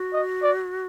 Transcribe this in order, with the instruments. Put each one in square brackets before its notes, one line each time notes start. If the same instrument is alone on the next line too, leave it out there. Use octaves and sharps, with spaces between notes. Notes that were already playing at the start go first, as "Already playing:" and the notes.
Already playing: [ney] F#4
[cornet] D#5
D5